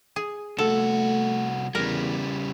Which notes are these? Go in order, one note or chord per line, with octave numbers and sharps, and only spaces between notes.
G#4
C2 A3 F#4 A4
E2 C#3 G3 A#4